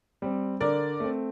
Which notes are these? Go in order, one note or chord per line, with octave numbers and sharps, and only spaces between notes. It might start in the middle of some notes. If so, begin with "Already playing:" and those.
G3 C4
D3 A#4 D5
A3 C4